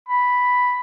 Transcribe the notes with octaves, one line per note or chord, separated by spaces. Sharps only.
B5